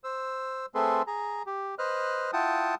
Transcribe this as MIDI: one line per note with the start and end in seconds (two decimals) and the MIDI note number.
0.04 0.66 72
0.04 0.66 88
0.75 1.02 57
0.75 1.02 60
0.75 1.02 68
0.75 1.02 69
0.75 1.02 71
0.75 1.02 84
1.07 1.43 68
1.07 1.43 82
1.46 1.75 67
1.79 2.31 71
1.79 2.31 72
1.79 2.31 75
1.79 2.31 89
1.79 2.31 90
2.33 2.75 64
2.33 2.75 65
2.33 2.75 78
2.33 2.75 79
2.33 2.75 81
2.33 2.75 87